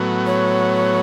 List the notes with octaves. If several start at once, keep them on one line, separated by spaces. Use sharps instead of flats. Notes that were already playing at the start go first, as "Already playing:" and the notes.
Already playing: A2 F#3 B3
C#5